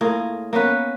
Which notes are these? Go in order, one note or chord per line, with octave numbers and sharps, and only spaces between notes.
A2 A#3 F4 G#4
A#3 B3 C#4 B4